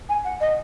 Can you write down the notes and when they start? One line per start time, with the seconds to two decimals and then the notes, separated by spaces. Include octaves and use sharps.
0.09 G#5
0.24 F#5
0.40 D#5